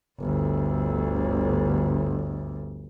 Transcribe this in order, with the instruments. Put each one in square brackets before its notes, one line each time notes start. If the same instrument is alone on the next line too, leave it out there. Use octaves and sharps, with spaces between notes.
[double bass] G1 D2